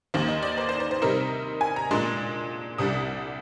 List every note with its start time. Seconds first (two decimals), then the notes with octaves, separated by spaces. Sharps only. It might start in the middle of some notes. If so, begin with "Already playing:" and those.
0.14 D#2 D#3 A#3 C5
0.28 D#5
0.42 D5
0.58 C5
0.69 C5
0.80 C5
0.91 C5
1.02 C3 G3 C4 D#4 A#4
1.61 G#5
1.76 A#5
1.91 A#2 G#3 D4 C6
2.78 C2 C3 G3 D4 D#6